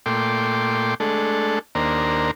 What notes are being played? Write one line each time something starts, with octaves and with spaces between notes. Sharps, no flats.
A#2 A3 G5 C6 D6
G#3 A3 D4 A4
D#2 A#3 D4 C5 A#5